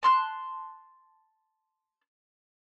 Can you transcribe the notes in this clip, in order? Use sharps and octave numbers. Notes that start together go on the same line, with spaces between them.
A5 C6 F6 F#6